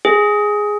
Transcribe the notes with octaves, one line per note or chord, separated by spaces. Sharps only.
G#4